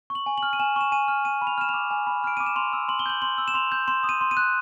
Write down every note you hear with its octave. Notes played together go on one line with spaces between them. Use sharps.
C#6
F#7
G#5
F6 F#7
D#7
G#5 E7
C#6 E7
G#5 D#7
F6
G#5 D#7
B5
F7
F6 E7
D6 F7
G#5
B5
F6 D7
D6 D#7
E7
C6 F7
E6
C6 F#7
G7
G6 F#7
C6 F#7
E6
E7
C6 F7
G6
C6 E7
D#6
D#7
C6
D#7
F#6